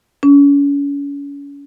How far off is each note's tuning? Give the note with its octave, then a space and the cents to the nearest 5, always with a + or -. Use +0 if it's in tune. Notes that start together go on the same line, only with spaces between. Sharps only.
C#4 +35